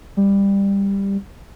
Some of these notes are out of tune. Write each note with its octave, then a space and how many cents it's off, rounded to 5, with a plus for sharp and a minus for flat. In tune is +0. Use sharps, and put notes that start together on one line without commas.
G3 +15